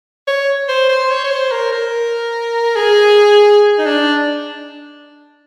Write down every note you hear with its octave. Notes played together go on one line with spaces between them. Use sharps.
C#5
C5
C5
C#5
C#5
C5
A#4
A#4
G#4
D#4
D4